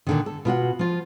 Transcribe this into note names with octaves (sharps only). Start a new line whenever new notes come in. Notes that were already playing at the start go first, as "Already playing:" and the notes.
A#2 D3 D#3
A4
B2 F4 F#4 F#5
F3 F4